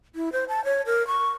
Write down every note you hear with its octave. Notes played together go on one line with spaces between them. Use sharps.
E4
C5
A5
C#5
A#4
C#6